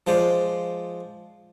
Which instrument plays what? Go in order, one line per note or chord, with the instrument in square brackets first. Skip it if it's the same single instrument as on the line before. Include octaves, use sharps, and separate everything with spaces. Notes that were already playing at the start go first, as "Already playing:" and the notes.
[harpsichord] F3 G#3 C5 D5